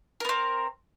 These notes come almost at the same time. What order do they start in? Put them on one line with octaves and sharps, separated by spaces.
A#4 B3 C4